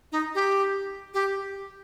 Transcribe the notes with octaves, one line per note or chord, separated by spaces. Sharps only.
D#4
G4
G4